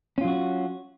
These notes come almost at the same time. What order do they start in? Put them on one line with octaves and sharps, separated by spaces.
C#4 F4 F#3 F#4